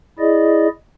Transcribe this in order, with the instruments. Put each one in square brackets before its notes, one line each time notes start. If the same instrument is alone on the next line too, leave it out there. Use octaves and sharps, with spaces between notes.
[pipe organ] E4 G#4 D5 D#5